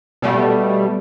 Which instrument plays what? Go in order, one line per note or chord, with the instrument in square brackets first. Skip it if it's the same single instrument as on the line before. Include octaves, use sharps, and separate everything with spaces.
[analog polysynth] B2 G3 A3